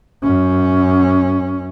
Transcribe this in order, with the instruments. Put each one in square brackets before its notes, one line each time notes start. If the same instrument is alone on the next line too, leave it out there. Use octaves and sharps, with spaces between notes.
[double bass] F#2 C#4